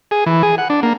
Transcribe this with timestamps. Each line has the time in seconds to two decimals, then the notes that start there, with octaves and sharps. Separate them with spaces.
0.11 G#4
0.26 E3
0.43 G#4
0.58 F#5
0.70 D4
0.83 A#3